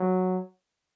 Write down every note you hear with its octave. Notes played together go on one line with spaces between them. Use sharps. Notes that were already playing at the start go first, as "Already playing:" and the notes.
Already playing: F#3